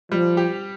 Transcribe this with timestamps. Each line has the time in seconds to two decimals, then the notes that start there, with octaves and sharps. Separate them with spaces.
0.12 F3 G3
0.37 G4